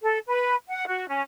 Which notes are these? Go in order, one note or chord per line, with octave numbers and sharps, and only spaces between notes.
A4
B4
F#5
F#4
C#4